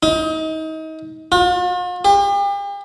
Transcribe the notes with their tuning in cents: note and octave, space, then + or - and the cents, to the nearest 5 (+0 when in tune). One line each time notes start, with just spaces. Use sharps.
D#4 +30
F4 +45
G4 +40